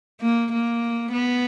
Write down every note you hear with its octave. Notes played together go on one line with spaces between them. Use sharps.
A#3
A#3
B3